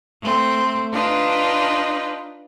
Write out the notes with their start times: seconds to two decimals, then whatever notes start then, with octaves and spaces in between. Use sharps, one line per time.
0.22 A3 C4
0.92 D4 D#4 F4 B4